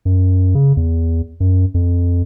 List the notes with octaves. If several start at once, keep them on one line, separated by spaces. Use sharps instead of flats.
F#2
C#3
E2
F#2
F2